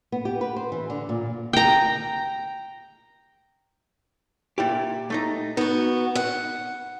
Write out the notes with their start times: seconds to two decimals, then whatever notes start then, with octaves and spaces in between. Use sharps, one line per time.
0.12 B3
0.25 G4
0.41 B4
0.56 C5
0.72 E3
0.90 D3
1.09 A#2
1.53 G5 A#5
4.58 A#2 E4 G4
5.10 A3 D#4 A#5
5.57 B3 D#4 F#4
6.15 F#5